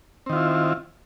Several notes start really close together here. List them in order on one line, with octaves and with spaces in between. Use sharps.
C4 D#3 F4 E4